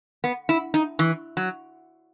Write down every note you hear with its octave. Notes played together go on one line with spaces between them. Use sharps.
B3
E4
D#4
E3
F#3